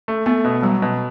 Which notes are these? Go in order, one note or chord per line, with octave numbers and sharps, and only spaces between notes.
A3
A3 B3
B2
F#3 G3
B2